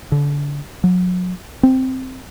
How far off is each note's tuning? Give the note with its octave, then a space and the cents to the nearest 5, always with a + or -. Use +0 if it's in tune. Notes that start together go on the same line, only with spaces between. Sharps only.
D3 -30
F#3 -35
C4 -5